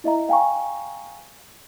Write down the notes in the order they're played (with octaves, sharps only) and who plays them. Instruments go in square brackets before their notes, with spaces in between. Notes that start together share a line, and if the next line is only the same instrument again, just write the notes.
[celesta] E4 D#5 E5 A#5
F5 G5 G#5 A#5 C#6